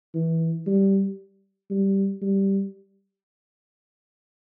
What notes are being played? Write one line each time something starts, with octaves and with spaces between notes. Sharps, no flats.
E3
G3
G3
G3